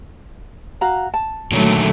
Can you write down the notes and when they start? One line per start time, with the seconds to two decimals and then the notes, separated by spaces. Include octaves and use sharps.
0.81 F#4 F5 A#5
1.14 A5
1.52 A#2 D3 D#3 F#3 A3